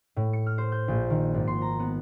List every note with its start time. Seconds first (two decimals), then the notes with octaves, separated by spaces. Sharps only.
0.16 A2
0.33 C#7
0.46 F6
0.58 C5
0.72 G6
0.88 A#1
1.10 D#3
1.34 G#1
1.47 C6
1.62 A#5
1.79 B3